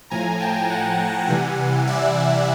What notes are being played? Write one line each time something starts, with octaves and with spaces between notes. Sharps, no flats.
A2 F3 G#5 A#5
G5 A5
F#5 G#5
C3 E3 G3
D5 E5